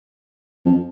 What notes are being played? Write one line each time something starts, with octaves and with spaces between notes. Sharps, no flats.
F2